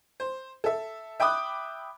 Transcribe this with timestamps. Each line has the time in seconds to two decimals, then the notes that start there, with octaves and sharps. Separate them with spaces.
0.20 C5
0.64 A4 E5
1.20 E5 G5 B5 D6 D#6 F#6